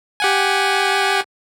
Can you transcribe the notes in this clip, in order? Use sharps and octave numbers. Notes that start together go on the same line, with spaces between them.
G4 F#5 G#5